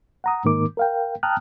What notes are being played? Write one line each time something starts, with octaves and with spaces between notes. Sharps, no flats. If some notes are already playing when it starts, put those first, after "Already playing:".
F#5 A#5 D#6
G#2 D#3 A#3 D#4 A#4 D6
A#4 F5 G5
G5 A5 A#5 D#6 F6 F#6